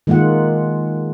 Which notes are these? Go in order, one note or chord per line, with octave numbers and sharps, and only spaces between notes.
D#3 G#3 A#3 F4 F#5